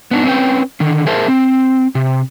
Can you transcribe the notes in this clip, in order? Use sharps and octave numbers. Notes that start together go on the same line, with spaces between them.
B3 D4 D#4
C4 C#4 B4 G5
D3 D#3
G#4 A#4 C5 E5 A5
C4
C3